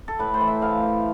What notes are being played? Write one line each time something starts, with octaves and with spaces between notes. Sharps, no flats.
A4
A2 B4
C5
E3
E5
A2 F5
E3